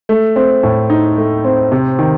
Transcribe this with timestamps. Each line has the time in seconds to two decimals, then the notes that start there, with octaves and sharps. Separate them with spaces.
0.09 A3
0.36 C4
0.63 A2
0.90 D#4
1.18 A3
1.45 C4
1.72 C3
1.99 D#3